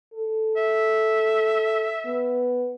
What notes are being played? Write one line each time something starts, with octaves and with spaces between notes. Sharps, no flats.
A4
E5
B3